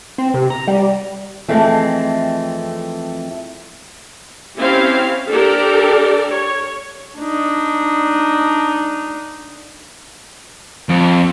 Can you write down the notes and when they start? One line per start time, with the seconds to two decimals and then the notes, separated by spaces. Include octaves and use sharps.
0.18 C4
0.34 C3
0.50 A#5
0.67 G3
1.49 F2 E3 G#3 A3 C4
4.58 C4 C#4 E4 G4 F5
5.29 D4 G4 A4 A#4 D5
6.30 C#5
7.18 D4 D#4
10.89 F2